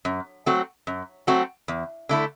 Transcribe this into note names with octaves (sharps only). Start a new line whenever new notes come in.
F#2
F#3 A3 C4 F#4
F#2
F#3 A3 C4 F#4
E2
D3 A3 E4